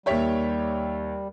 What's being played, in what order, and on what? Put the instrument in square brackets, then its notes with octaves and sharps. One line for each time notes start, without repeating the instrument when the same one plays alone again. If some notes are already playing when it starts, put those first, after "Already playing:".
[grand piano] D#2 E5 [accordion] G3 [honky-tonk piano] G4 C#5 B6